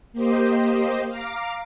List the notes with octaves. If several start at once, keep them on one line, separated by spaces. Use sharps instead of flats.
A#3 G4 C5 D#5
F5 A#5 D6